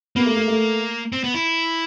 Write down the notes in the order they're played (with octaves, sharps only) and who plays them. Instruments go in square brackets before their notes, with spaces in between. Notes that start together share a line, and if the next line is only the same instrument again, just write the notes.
[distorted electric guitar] A#3 [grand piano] B3
[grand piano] A3
A3
A3
[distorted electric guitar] C4
B3
E4